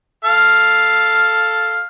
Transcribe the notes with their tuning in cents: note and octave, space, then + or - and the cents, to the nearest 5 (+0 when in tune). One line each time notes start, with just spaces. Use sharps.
A4 +0 F5 +0